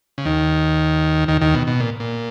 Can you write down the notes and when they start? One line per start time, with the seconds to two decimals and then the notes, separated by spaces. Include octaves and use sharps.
0.18 C#3
0.25 D#2 D#3
1.28 D#2 D#3
1.41 D#2 D#3
1.54 B2
1.67 B2
1.80 A#2
2.00 A#2